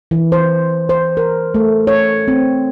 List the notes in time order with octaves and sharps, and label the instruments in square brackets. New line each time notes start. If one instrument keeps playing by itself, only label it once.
[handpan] E3
C5
C5
A#4
A3
C#5
C4